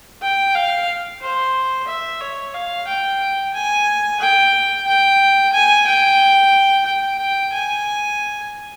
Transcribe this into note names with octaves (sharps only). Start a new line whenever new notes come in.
G5
F5
C5
E5
C#5
F5
G5
G#5
G5
G5
G#5
G5
G5
G5
G#5